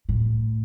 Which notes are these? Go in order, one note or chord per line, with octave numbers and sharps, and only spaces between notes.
A2